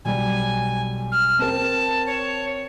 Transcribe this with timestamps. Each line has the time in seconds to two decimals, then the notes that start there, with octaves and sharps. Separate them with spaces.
0.05 B1 G3 G#5
1.12 F6
1.39 C4 A#4 A5
2.07 C#5